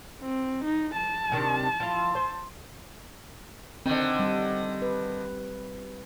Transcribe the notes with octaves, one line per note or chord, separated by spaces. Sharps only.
C4
D#4
A5
C3 D#3 D4
F3 E4 F4
C5
D3 D#3 C4
G3
B4